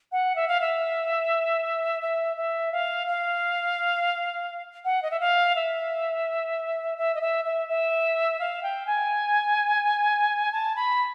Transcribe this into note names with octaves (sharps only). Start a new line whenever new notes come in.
F#5
E5
F5
E5
E5
E5
F5
F5
F#5
D#5
E5
F5
E5
E5
D#5
E5
E5
E5
F5
G5
G#5
A5
B5